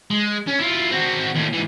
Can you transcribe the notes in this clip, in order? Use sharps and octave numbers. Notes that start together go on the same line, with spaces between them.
G#3
C#4
E4 F4
C4 F#4
D#2 A2
G#2 E3